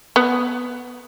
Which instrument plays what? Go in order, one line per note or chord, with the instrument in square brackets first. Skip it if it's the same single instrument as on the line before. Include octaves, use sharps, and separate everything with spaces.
[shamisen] B3